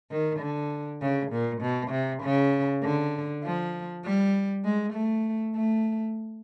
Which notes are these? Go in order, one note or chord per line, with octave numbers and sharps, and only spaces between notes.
D#3
D3
C#3
A#2
B2
C3
C#3
D3
F3
G3
G#3
A3
A3